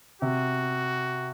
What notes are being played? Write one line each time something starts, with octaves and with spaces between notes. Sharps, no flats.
C3 F#4